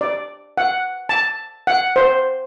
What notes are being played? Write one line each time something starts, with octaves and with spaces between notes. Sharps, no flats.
D5
F#5
A5
F#5
C5